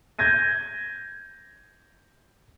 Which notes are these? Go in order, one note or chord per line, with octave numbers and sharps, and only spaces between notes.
G6 G#6 A#6 D#7